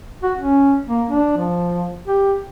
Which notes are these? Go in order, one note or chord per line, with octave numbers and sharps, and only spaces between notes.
F#4
C#4
A#3
D4
F3
G4